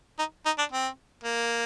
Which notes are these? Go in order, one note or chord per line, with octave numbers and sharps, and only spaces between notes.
D#4
D#4
D4
C4
A#3